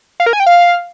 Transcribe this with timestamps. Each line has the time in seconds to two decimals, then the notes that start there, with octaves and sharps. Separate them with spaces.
0.20 F5
0.26 A#4
0.33 G#5
0.40 G5
0.46 F5